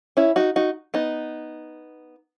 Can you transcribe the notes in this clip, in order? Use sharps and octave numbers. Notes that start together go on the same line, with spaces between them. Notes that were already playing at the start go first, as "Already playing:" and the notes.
C#4 E4
D#4 F#4
D#4 F#4
B3 D#4